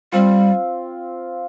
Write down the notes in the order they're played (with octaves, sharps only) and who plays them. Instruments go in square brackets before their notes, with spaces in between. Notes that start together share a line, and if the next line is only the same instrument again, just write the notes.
[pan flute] G3 [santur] C4 F4